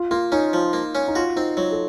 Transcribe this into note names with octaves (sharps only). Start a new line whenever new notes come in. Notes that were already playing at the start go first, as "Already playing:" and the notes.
Already playing: F4
A#3 F4
C#4 D#4
F3
A#3
C#4
D#4
F4 F#4
C4 D#4
F#3 F4
A4